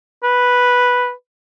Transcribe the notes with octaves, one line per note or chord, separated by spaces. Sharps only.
B4